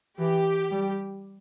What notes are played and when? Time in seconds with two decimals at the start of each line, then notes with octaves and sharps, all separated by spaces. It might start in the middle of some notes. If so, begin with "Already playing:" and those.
0.19 E3 G4
0.71 G3